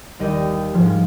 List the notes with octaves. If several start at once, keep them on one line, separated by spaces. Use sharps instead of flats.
D#2 D#3 G3 D#5
G#2 F3 G#3